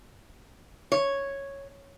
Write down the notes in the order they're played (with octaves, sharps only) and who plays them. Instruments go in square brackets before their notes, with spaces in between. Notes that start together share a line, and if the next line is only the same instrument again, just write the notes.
[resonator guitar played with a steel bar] C#5